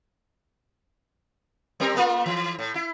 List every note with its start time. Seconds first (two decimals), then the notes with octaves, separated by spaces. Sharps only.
1.80 G3 C4 A#4
1.95 A3 A#3 F4
2.26 E3
2.59 A2
2.75 E4